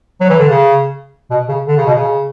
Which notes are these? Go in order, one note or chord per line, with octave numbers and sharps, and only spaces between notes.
F#3
E3
D3
C#3
B2
C#3
D3
C#3
B2
C#3